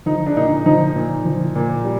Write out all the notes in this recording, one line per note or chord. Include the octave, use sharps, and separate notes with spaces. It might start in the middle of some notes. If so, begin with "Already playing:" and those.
F3 D#4
D4
A#2 D#4
F3 D#4
A#2
F3
A#2
G3